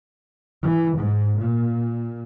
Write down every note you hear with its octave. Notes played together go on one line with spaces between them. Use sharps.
E3
G#2
A#2